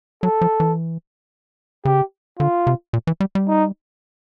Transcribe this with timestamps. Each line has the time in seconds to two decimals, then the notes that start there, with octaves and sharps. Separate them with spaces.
0.23 F#3 A4
0.41 F3
0.60 E3
1.85 C#3 G4
2.39 D3 F4
2.67 C3
2.93 A#2
3.07 E3
3.20 G3
3.35 G3
3.48 D#4